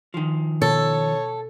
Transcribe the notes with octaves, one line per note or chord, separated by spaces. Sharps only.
D#3 F3
B2 A4 C#5 A5